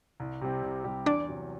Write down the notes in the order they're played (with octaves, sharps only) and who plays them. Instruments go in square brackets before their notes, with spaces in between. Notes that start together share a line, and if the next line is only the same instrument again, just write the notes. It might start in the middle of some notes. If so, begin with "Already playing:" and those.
[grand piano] C2
C3 G3 C4 G4
C2
C3 G3 C4 G4
[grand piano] E2 [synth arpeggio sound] D4 D5
[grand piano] C3 F#3